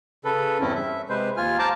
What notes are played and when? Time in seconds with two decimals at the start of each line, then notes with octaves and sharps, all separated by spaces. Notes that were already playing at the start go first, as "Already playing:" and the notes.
0.24 C#3 A4 B4
0.60 E2 G2 C4 C#4 E4
0.75 E5
1.09 C3 G#3 B4 C5
1.37 D#2 F4 G#5 F6
1.59 C5 F5 A5 A#5 D6